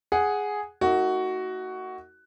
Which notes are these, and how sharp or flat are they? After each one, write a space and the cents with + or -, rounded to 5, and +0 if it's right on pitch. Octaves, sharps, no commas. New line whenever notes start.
G#4 +0 F#5 +0
A#3 -35 D#4 +40 F#4 +10